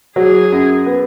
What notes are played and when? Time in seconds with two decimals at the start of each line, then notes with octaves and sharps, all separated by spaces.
0.16 F#3 G#4
0.52 F#2
0.86 B3